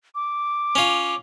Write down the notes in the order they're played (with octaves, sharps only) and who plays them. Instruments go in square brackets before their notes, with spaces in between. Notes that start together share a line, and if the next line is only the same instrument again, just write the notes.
[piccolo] D6
[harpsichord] C#4 F4